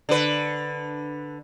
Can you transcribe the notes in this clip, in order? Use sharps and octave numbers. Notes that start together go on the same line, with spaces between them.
D3 B4